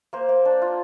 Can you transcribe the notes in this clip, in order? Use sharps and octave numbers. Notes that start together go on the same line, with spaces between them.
A#3 C5
A#3
D4
F4